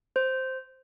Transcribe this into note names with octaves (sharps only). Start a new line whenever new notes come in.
C5